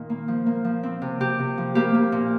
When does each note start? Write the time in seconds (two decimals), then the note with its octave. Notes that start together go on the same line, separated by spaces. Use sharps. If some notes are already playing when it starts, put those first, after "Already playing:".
Already playing: A#2 D#3
0.10 A#3
0.28 F3
0.46 A#3
0.64 F3
0.83 C4
1.02 C3
1.20 C3 G4
1.39 C3
1.58 F3
1.75 A#3 G4
1.94 A#3
2.12 A#2